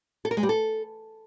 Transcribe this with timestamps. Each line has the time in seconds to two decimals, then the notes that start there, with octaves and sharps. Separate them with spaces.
0.25 A4
0.31 A#4
0.37 G#3
0.43 G3
0.49 A4